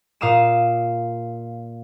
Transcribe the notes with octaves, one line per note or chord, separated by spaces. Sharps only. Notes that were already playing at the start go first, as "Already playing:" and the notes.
A#2 F5 D#6 D#7 E7